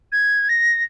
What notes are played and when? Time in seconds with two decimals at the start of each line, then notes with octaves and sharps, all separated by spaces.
0.12 G#6
0.49 A#6